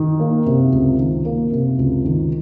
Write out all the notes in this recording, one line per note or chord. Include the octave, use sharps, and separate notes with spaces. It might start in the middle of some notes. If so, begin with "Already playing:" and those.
Already playing: D#3
A#3
C3
C#2
D#3
A#3
C3
C#2
D#3